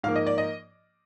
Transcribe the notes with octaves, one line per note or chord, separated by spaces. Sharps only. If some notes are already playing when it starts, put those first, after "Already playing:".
G#2 F3 A#3 F5
D#5
D5
D#5